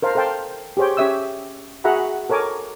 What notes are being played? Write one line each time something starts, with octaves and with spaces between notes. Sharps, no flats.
A#4 C5 F5 A5
A4 C5 F5 G5 A5
G4 G#4 C5 C#5 G5
C#4 G4 C#5 E5 D#6 E6
F#4 G#4 E5 F#5 A#5 B5
A4 A#4 C#5 G#5 D6